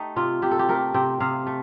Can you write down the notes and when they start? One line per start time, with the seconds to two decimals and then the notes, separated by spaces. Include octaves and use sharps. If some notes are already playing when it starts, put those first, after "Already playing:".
Already playing: A3 D#4 G4
0.16 C3 F4
0.42 C3 G4
0.51 A4
0.59 G4
0.69 A3 A#4
0.94 C3 G5
1.20 C3 F5
1.47 A3